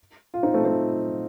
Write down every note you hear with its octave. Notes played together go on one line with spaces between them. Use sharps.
F4
C4 D#4
A3 C4
A3 C4